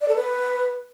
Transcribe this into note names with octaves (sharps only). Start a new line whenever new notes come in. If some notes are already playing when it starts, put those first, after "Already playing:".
D5
A4
B4